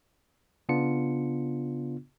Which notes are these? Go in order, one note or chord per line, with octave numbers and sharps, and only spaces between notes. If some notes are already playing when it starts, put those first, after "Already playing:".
C#3 B3 D4 F4 C#7